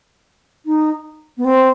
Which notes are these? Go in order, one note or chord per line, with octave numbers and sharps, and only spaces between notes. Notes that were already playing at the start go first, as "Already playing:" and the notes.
D#4
B3
C4